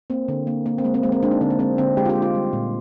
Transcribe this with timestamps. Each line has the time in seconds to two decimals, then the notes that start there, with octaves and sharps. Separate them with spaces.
0.10 A#3 C4
0.28 D3
0.47 A#3
0.66 A#3
0.78 C4
0.84 G#3 A#3
0.94 C4
1.03 G#3 A#3
1.12 C4
1.23 G#3 D4
1.31 D#4
1.41 D3 C4
1.50 A#3
1.59 G#3 C4
1.78 D3 C4
1.97 G#3 G4
2.05 F4
2.09 G4
2.15 G#3
2.22 F4
2.35 G3
2.53 A#2